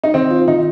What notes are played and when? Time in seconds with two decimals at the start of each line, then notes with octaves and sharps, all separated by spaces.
0.03 D#4
0.14 D#3 C4
0.31 F4
0.48 D#3 D#4